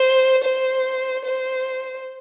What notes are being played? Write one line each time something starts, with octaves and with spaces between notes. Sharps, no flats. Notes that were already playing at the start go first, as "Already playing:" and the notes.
Already playing: C5
C5
C5